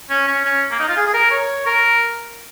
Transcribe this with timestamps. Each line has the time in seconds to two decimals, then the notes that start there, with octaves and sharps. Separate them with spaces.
0.10 C#4
0.28 C#4
0.45 C#4
0.71 A#3
0.80 D#4
0.88 F4
0.97 G#4
1.07 G#4
1.14 A#4
1.31 C#5
1.66 A#4